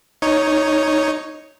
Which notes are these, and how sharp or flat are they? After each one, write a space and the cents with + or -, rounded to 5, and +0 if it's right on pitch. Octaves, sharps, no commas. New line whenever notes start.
D#4 +0 C#5 +0